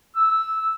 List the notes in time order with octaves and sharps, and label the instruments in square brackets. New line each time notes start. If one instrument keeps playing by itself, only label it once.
[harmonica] E6